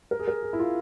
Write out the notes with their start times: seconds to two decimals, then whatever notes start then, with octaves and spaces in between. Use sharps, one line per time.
0.11 A#4
0.19 G#4
0.28 A#4
0.43 G#4
0.53 E4
0.59 F4